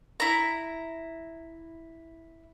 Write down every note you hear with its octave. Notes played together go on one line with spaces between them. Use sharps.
E4 A#5